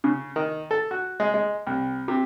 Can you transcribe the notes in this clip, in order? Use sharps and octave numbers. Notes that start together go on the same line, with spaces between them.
C#3
D#3
A4
F#4
G#3
G#3
C2
C3